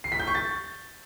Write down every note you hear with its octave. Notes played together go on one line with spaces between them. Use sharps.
C7
B6
G6
C#6
A6